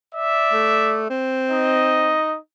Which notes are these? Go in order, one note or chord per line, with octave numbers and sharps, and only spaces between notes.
D5 E5
A3
C4
D#4 D#5